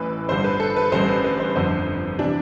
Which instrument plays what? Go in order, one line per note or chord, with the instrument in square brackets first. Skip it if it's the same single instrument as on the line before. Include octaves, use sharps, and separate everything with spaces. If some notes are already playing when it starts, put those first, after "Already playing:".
Already playing: [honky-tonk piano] A1 A2 E3 B4
G1 G2 D3 C5
B4
A4
B4
A1 G2 D3 C5
B4
B4
C5
G1 F2 D3 C5
C3 E3 D4